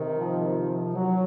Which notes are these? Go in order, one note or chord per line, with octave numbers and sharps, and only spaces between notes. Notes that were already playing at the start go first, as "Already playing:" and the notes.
Already playing: C3 D#3
F3
F3
F#3